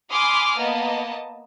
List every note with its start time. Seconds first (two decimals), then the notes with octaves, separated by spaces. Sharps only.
0.12 G#5 B5 C6 D6 D#6 F6
0.57 A#3 B3 D#5 A5